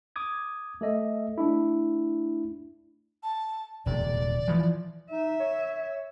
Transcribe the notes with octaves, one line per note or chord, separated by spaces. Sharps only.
D6 D#6 G#6
A3 A4 D#5 E5
A3 D4 E4
A5
D#1 C3 D5
E3 F3
D#4 E5
C#5